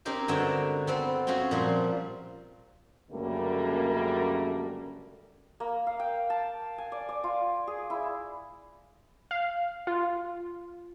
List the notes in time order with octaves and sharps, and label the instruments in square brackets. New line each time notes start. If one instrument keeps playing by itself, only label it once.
[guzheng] C4 C#4 D#4 G4 A#4 C5
G2 D3 G#3 F#4 E5 G5
B3 C4 A4 B4
C4 C#4 F4 F#4 G#4 C5
A#2 F3 G3 C4
[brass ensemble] C#2 F#2 D3 G3 A3 A#3
[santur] A#3
F5
G5
A5
G#5
D5
D5
F4
G#4
E4
[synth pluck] F5
F4